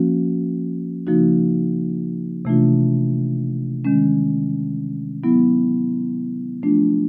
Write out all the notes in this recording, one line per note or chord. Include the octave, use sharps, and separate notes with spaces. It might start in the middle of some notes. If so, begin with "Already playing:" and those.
Already playing: F3 A#3 C#4 F#4
C#3 F3 A#3 D#4 F#4
C3 E3 A3 D4 F4
D#3 G#3 C#4
F#3 B3 E4
F3 A3 D4 F4